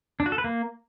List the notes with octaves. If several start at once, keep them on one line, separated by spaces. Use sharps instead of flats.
D4
F#4
A4
B4
A#3